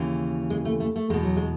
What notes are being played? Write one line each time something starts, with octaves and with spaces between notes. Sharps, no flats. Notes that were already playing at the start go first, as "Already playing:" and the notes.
Already playing: D#2 C#3 E3
G#3
A3
A3
A3
E2 B2 G#3
F#3
G#3